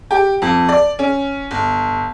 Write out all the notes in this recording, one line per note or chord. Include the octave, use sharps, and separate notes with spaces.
G4
F2
D5
C#4
G1